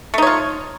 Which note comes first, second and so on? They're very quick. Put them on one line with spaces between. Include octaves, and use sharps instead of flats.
A3 D#4 C#5 F4